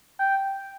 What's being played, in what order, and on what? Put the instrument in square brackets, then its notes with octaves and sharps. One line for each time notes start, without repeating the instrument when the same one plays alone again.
[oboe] G5